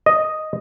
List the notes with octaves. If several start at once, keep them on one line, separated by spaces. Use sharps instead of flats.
D#5